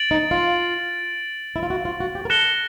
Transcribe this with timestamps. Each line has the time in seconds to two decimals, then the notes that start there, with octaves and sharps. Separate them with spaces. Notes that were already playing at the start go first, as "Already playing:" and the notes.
Already playing: A6 D7 F#7
0.11 D#4
0.31 F4
1.56 E4
1.63 F4
1.70 F#4
1.85 F4
2.00 F#4
2.15 G4
2.25 A#4
2.30 A4 F#6 A#6 C#7 E7 G7